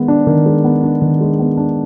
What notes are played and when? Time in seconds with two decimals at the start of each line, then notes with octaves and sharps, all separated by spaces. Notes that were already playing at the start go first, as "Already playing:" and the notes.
Already playing: D#3 G#3 B3
0.08 D4
0.27 D#3
0.46 G#3
0.64 B3
0.84 D4
1.02 D#3
1.21 G#3
1.39 B3
1.57 D4